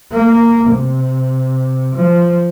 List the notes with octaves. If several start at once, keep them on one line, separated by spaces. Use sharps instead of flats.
A#3
C3
F3